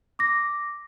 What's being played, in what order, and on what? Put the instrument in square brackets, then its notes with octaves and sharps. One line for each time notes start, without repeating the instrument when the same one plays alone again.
[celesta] D6 A#6